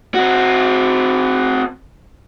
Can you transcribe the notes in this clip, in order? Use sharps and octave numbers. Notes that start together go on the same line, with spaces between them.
C4 F#4